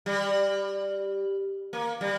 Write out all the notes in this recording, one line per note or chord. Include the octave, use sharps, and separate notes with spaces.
G3
A#3
G3